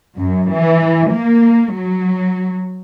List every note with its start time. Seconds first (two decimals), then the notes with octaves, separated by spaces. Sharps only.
0.17 F#2
0.53 E3
1.10 A#3
1.75 F#3